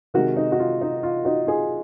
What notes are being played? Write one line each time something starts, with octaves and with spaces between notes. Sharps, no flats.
C3 D#3 G#3 F#4 A#4
D#4
F#4
F4
D#4
F4
D#4 F#4
F4 G#4